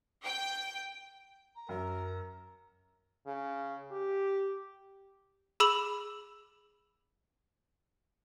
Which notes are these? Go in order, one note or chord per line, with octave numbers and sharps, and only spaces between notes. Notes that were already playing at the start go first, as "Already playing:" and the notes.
G5
A#5
F#2 A#4
C#3
G4
G#4 B5 E6 F7 F#7